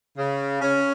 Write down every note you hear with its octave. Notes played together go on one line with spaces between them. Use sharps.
C#3
C#4